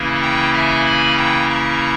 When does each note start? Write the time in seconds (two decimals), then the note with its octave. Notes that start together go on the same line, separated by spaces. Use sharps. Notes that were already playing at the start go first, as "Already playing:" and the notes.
Already playing: C#3 E3 A#3 C#4 E4
0.22 G5 A#5
0.53 E5 G#5
0.86 G#5 B5
1.17 G5 A#5
1.49 A#5 C#6